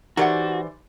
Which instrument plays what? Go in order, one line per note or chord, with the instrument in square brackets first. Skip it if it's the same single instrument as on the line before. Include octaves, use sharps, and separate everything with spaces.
[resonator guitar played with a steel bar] E3 C5 D5 [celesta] D#4 G4 [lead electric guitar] F#4 [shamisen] A#4 F#5